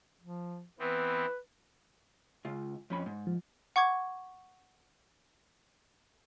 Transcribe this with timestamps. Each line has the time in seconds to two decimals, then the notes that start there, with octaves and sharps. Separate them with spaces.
0.21 F3
0.79 E3 B3 C4 B4
2.45 C#2 F4
2.90 F2 C#4 B5
3.06 G#2
3.27 F3
3.76 F#5 C#6 D6 G#6